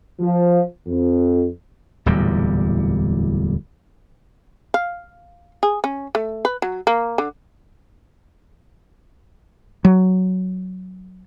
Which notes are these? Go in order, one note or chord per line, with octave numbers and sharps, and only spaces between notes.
F3
F2
D1 E2 A#2 G3
F5
G#4
C#4
A3
B4
F#3
A#3
D3
F#3